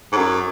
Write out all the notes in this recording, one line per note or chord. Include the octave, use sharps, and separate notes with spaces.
G#2
F#2